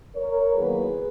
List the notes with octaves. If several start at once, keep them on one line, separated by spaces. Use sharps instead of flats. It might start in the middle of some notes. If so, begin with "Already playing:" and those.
A#4 C#5
E2 D#3 F#3 A#3 G#4 B4